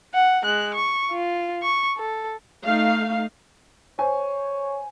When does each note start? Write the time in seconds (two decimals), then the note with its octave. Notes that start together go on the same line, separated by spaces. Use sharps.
0.14 F#5
0.44 G#3 F#6
0.74 C#6
1.11 F4
1.63 C#6
1.97 A4
2.65 A3 D#4 F5
3.99 C5 C#5 G#5